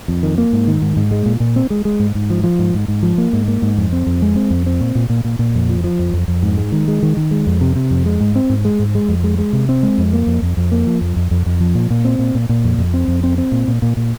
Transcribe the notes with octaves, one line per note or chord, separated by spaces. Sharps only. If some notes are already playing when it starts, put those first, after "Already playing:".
F2
D#3
A#3
G#2
D#3
G#2
G#2
G#3
A#2
A#2
C4
G#3
G#3
G#2
G#2
F3
F3
G#2
G#2
G#2
F3
A#3
G#2
A#3
G#2
F2
C4
F2
G#3
C4
F2
C4
A#2
A#2
A#2
A#2
A#2
F2
F3
F3
F2
F2
F2
G#2
G#3
D#3
G#3
D#3
D#3
G#3
F2
C3
C3
F2
G#3
G#2
C4
G#2
G#3
G#2
G#3
F2
G#3
G#3
C3
C4
G#3
F2
A#3
F2
F2
F2
A#3
F3
F2
F2
F2
F2
F3
A#2
A#2
C4
A#2
A#2
A#2
F2
F2
C4
F2
C4
C4
A#2
A#2
A#2
A#2